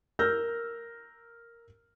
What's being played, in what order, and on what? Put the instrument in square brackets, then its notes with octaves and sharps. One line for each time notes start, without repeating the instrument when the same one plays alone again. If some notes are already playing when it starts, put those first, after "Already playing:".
[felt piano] A#4 E6 F6 G6 A#6